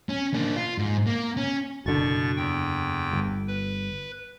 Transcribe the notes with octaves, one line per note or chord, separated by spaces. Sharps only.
C#4
A#3 D4
F4
G#2
A#3
C#4
F#1 B2 D3 C#6 A6
E2 G5
G1
B4